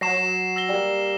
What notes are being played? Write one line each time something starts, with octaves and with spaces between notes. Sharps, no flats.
F#3 A#6 C7 E7
E6 A#6 G7
G3 A#3